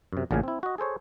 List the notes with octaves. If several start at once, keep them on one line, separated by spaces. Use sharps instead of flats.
F#2 C3
A1 A#2 C#3 F5 G#5
C4 E4
F#4 D#5
G#4 A4 C5 C#5